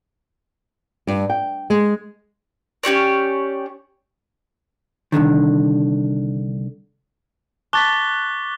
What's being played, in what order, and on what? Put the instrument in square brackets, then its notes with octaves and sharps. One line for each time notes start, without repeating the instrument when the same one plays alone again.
[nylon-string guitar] G2
G5
G#3
[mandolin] C#4 G4 C#5 D5
[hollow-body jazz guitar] C2 F#2 D3 D#3
[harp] A5 [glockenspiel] C#6 A6 B6 [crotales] D6 F#6 G7